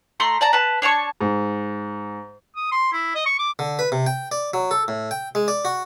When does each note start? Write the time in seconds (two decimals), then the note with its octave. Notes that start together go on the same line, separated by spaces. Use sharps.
0.20 A3 A#5 C6
0.41 D5 A5 A#5
0.53 B4 A5
0.82 D4 C#5 A5 C#6
1.21 G#2
2.56 D#6
2.72 C6
2.92 E4
3.15 D#5
3.26 C#6
3.39 D6
3.59 D3
3.79 B4
3.92 C3
4.06 G5
4.32 D5
4.54 F#3
4.71 A4
4.88 A2
5.11 G5
5.35 G#3
5.48 D5
5.65 F#4